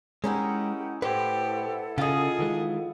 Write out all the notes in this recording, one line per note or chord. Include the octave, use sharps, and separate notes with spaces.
G#3 C#4 D#4 E4 G4 A#4 F#5
A2 E4 G4 A4 B4 C5 F#5
C#3 F4 G#4 D#5
D#3 E3 G#3